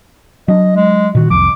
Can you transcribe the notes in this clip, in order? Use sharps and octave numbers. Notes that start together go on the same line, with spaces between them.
F#3 D4 D#5
G#3
A#2 D#3 F#4
C2 F2 F3 D6